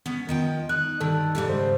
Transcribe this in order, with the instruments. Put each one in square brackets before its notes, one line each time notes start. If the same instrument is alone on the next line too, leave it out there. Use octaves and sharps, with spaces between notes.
[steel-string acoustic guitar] B3 C#4
D#3 F3 G5
[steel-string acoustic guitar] D#4 [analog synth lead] F#6
[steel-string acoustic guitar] G2 D#3 [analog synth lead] A4
[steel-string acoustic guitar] G#2 C#3 G3
[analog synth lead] C5